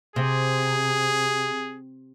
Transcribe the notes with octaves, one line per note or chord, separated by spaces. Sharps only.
C3 G#4